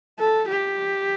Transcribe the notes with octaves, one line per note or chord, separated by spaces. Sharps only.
A4
G4